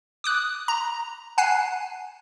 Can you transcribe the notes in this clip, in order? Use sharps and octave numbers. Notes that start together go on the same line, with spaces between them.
D6 D#6 F#6
A#5
F#5 G#5 F#6 C7 E7